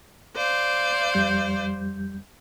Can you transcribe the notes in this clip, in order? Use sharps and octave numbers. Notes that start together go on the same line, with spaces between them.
C5 D5 F5
F2 G3 G6